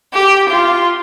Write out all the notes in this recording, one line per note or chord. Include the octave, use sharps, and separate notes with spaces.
G4
F4